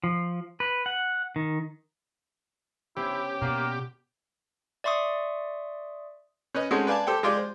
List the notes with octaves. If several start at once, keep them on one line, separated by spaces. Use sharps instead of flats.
F3
B4
F#5
D#3
B3 C#4 E4 G4 C5
B2 A#3 D5 F#5 C6
D5 E5 C6 C#6 D#6
C#4 B4 D#5
G#3 A3 C4 C#4 D#4 F#4
B4 D5 F5 G#5 A5
G4 A4 C5 G5
G#3 F4 G4 D5
C5